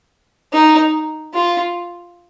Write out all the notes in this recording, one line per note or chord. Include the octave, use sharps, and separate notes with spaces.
D#4
F4